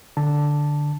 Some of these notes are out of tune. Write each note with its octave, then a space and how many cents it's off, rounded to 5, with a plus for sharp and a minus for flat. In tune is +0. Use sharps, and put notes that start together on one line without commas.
D3 +0 A5 +0